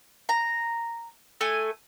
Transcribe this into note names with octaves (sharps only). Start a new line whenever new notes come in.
A#5
A3 G#5